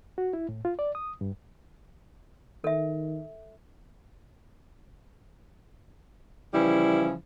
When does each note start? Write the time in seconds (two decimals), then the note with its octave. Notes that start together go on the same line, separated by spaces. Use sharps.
0.18 F#4
0.33 E4
0.49 A2
0.65 F4
0.79 D5
0.95 D#6
1.21 G2
2.64 D#3 A4 E5
6.54 C#3 E3 F3 G3 E4